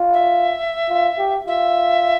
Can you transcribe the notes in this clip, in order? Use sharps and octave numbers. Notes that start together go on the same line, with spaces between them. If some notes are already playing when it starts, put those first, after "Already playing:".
Already playing: F4
E5
F4
G4
F4 E5